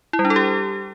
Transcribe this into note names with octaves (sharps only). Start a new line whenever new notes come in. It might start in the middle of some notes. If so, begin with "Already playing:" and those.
E4
G3
D4
A4
G4